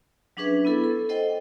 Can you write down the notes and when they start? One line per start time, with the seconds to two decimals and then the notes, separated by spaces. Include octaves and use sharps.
0.37 F#3 C#4 D4 G#4 B4 E5
0.65 B3 E4 A4
0.84 A4
1.09 A4 C5 D#5 F#5 G5